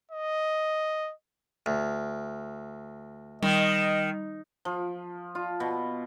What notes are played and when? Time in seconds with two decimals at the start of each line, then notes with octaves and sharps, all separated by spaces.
0.11 D#5
1.66 D2
3.42 D#3 G3 D#5
4.65 F3
5.35 F4
5.60 B2